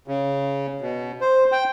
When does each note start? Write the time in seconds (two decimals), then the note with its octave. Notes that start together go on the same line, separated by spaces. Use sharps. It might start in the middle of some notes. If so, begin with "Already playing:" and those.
0.08 C#3
0.81 B2
1.21 C5
1.52 G5